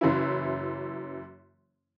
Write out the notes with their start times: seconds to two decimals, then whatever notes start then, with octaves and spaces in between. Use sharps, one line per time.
0.01 F#1 F#2 E3 C#4 E4